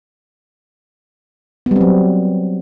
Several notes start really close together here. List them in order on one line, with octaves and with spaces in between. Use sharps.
B3 G3 C4 F#3